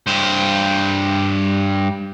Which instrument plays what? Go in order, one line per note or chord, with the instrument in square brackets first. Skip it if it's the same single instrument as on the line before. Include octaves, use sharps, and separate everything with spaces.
[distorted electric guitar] G2 C5